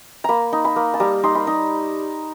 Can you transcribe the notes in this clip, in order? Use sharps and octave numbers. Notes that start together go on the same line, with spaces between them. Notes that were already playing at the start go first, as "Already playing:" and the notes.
A#3 A#5 B5
D#4
B5
A#3
A5
G3 A#5
D#4 C6
B5
D#4